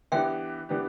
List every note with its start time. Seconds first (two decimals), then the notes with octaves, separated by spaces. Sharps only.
0.12 E3 B3 D4 G4 E5 G5
0.69 E3 B3 D4 G4